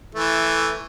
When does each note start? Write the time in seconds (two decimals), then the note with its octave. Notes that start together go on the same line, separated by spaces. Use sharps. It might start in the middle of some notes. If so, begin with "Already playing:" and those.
0.15 E3 A3